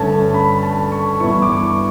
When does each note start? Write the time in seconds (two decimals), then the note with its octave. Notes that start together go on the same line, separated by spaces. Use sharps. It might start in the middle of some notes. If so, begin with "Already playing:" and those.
Already playing: G2 D3 A3 C#4 A5
0.34 B5
0.63 A5
0.92 C#6
1.20 G2 E3 B3 E4 C#6
1.42 D6
1.63 C#6